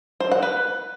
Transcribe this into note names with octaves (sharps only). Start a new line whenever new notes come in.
C5
F#5
B4